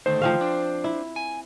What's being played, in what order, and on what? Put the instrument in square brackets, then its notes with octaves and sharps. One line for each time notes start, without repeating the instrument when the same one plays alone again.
[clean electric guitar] D2 D#3 A3 [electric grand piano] C5
[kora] F3 C4 F5
[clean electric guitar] D4
[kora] E4
[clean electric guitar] G#5